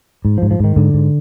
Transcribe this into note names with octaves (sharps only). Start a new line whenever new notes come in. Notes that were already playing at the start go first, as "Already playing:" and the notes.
G#2
F3
G#2
F3
G#2 D#3
G#2 D3
G#2